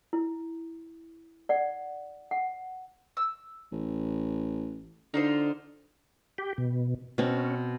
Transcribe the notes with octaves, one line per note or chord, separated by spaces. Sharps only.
E4
D5 F#5
F#5
E6
A1
D3 D#4 F4 C5
G4
B2
B2 C4 C#4